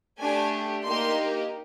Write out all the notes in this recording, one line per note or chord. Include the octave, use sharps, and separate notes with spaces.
A3 D4 G4 G#5
A#3 D#4 G4 C6